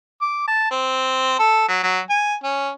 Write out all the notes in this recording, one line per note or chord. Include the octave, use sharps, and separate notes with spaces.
D6
A5
C4
A4
F#3
F#3
G#5
C#4